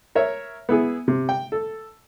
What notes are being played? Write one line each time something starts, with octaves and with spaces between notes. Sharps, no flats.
A#4 C#5 E5
B3 E4 G#4
C3
G5
A4